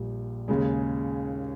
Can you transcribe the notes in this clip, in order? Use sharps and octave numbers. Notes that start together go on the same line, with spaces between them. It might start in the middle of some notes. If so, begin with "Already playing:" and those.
Already playing: A#1 A#2 G3
D#2 C#3 G#3